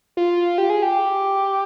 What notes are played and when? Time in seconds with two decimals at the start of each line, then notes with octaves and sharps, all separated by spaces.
0.17 F4
0.58 G4
0.70 G#4
0.82 G4